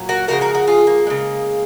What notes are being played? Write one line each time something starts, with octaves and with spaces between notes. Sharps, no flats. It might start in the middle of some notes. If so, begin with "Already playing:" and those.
Already playing: A#2 F#3
F#4 A#4
C#3 F3 G#3 F#4 A#4
F#4 A#4
F#4 A#4
F4 G#4
A#3
C#3 G#3